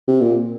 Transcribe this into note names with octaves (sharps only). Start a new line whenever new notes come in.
C3
A#2